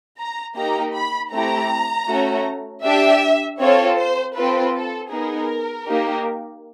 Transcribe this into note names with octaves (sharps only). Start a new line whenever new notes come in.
A#5
A#3 D#4 G4 A#5
B5
A3 C4 E4 G4 A#5
A3 C#4 F#4
D4 G4 E5
C4 F4 A4 C#5
C5
C4 F4 A4 B4
A4
B3 D#4 G#4 A#4
A#3 D#4 G4